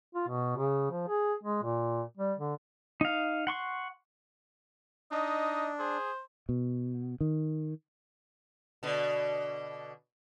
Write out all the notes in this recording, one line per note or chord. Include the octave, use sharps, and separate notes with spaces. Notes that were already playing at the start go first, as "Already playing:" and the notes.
F4
B2
C#3
F3
G#4
G#3
A#2
G3
D3
D#4 F5
F#5 C6 C#6
D4 D#4 D#5
G#4 C5
B2
D#3
B2 D3